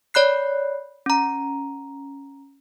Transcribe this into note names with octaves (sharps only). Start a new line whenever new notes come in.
C#5 D5 B5 F#6 C7
C#4 A#5